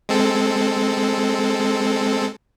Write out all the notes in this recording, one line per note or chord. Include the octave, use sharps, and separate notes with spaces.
G#3 C4 A4